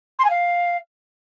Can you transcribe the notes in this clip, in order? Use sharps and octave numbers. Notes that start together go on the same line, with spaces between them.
C6
G#5
F5